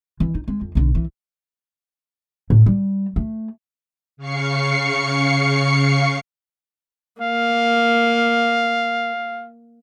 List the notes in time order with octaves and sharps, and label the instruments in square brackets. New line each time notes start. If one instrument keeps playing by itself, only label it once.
[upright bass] E3
D#4
G#3
F2
B1 D3
E3
A2
G3
A3
[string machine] C#3 F5 C#6 C7 C#7
[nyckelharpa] A#3 [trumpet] F5